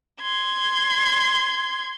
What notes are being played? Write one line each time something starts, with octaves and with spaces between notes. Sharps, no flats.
C6 G#6